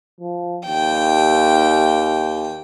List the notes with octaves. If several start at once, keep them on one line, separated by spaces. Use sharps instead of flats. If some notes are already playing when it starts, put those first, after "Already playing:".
F3
D#2 G5